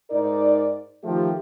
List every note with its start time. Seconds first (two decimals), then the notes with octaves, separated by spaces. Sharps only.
0.11 G#2 D#4 A#4 D5
1.03 D#3 F3 A3 G4